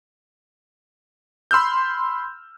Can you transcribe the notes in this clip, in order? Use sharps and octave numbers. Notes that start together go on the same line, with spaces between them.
B5 C6 E6 F6 G6